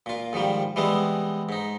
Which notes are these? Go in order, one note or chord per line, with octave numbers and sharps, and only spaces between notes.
A#2 F4
G#2 D#3 F3 G3
E3 G3 G#3 B3 C4
G#2 D#4